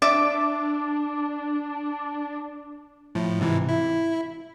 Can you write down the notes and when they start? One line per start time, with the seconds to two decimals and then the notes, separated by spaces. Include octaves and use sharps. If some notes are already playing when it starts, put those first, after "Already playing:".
0.02 D4 D5 E5 D6
3.15 A2 F3
3.40 G#2 C3 E3
3.69 E4